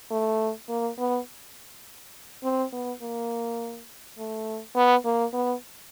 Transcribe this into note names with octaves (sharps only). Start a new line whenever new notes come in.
A3
A#3
B3
C4
B3
A#3
A3
B3
A#3
B3